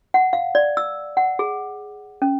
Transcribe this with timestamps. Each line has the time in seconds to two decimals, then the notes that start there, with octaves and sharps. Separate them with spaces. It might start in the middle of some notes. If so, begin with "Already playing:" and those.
0.14 F#5
0.33 F5
0.55 D5
0.77 E6
1.17 F#5
1.39 G#4
2.22 C#4